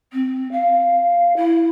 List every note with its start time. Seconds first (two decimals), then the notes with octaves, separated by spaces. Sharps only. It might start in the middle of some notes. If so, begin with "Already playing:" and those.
0.13 C4
0.52 F5
1.37 E4